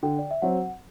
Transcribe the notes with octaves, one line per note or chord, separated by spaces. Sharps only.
D3 G5
D5
E5
F#3 C4 F#5